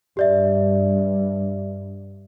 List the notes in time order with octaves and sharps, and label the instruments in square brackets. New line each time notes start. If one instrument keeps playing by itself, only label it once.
[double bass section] G2 [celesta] G4 D5 E5